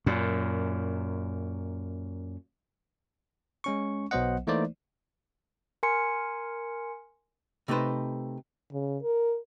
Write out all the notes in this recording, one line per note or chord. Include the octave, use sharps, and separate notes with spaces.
F#2 A#2
G#3 C#4 C#6
B1 F#3 B3 C5 D#5 F#5
E3 A3 A#3 D#4 C5 D5
A#4 G#5 C6 C#7
C3 A3 D#4 B4 C5
C#3
A#4